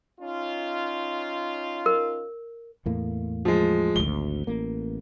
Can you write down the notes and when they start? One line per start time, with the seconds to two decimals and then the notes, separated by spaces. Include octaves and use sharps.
0.21 C#4 D#4 F4
1.86 A#4
2.86 E2 A2 A#3
3.45 F3 G#3
3.96 G#1 D2 G7
4.47 A1 A#3